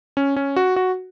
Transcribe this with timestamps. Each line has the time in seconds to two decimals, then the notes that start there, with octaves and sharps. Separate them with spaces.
0.17 C#4
0.36 C#4
0.56 F#4
0.76 F#4